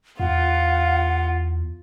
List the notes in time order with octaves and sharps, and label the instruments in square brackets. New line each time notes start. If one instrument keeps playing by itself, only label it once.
[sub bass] E2 [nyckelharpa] F4 [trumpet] F5 [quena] F#5